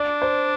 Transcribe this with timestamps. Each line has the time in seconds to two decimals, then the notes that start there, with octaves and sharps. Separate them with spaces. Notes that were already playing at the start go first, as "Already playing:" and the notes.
Already playing: D4 D5
0.22 C5